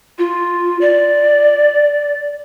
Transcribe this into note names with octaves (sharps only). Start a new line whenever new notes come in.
F4
D5